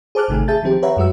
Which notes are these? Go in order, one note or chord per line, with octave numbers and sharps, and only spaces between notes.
G#4 C5 A5 D6 F6 F#6
G#1 C3 D#3 A3 G#5
G#4 E5 A5 G6 A6
D#3 F3 C4 G4
B4 C#5 E5 F#5 A#5
F#2 G#3 F#4 E6